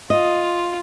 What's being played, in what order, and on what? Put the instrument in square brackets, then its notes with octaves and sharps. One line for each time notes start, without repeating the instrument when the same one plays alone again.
[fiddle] F4 [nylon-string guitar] D#5